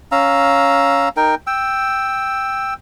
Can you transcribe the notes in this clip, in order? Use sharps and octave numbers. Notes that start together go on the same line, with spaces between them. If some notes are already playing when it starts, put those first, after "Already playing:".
C#4 F5 A#5 E6
D#4 A#4 G5
G5 E6